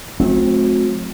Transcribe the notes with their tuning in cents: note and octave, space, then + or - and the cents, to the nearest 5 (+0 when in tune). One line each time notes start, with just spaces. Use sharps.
F#3 -45 A3 -35 C4 +0